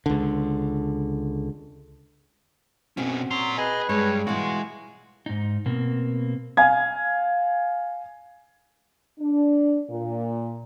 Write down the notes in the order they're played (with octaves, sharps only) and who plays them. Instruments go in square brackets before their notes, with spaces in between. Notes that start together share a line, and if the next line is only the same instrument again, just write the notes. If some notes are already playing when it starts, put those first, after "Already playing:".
[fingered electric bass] C#2 D3
[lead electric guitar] B2 C#4 [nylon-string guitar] C4 F#4
[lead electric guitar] A#2 A#5 [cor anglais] F#3 [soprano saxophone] C6
[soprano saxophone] G#4 [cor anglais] B4 [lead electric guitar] D#5
[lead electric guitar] G2 [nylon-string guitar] G#3 [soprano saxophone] C#5
[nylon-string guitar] B2 E3 [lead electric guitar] G#3 [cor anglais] F4 [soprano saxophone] F#4
[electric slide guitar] G#2 D#4
B2 A#3 C4
[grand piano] F5 G#5 G#6
[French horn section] D4
A#2